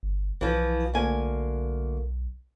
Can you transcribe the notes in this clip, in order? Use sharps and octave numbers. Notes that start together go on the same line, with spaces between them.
G1
B1 E3 F3
D2 A#3 G#5